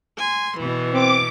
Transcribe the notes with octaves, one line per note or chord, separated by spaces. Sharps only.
G#5 C6
B2 E3
C4 D6